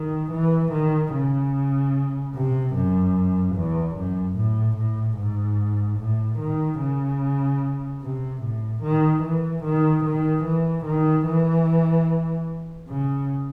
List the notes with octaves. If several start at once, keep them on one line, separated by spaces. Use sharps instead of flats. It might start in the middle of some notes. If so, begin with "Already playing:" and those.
Already playing: D#3
E3
D#3
C#3
C3
F#2
E2
F#2
A2
A2
G#2
A2
D#3
C#3
C3
A2
D#3
E3
D#3
D#3
E3
D#3
E3
C#3